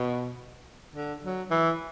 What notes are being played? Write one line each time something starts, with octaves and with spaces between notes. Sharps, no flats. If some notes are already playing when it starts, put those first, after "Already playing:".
Already playing: B2
D3
F#3
E3